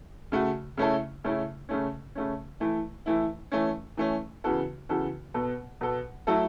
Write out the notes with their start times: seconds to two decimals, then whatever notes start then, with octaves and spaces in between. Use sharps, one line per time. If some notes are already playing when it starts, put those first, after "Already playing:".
0.32 C#3 A3 F#4
0.77 C#3 A3 C#4 E4 A4
1.24 C#3 A3 C#4 E4 A4
1.69 C#3 A3 C#4
2.15 C#3 A3 C#4
2.60 E3 A3 E4
3.06 E3 A3 E4
3.52 E3 A3 C#4
3.97 E3 A3 C#4
4.44 C#3 E3 B3 F#4 A4
4.89 C#3 E3 B3 F#4 A4
5.34 B2 B3 A4
5.81 B2 B3 A4
6.27 F#3 A3 E4 A4